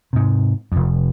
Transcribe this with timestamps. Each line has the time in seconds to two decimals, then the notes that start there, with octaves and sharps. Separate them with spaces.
0.13 G#2 C3
0.72 F1 F2